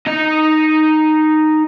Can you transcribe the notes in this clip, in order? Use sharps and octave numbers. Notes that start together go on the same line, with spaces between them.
D#4 D#5